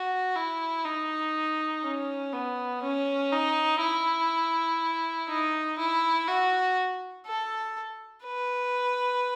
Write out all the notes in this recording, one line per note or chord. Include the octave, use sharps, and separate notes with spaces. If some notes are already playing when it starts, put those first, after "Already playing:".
Already playing: F#4
E4
D#4
C#4
B3
C#4
D#4
E4
D#4
E4
F#4
A4
B4